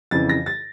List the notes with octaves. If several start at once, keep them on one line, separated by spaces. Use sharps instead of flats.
F2 C#3 E3 A6
A#6
A6